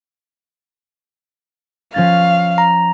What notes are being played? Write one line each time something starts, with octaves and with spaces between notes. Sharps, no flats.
F3 C#4 F5 A6
A#5